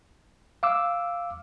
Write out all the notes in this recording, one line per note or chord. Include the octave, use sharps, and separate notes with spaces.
F5 D6 E6